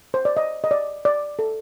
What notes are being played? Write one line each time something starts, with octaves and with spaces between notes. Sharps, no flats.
C5
D5
D#5
D#5
D5
D5
A4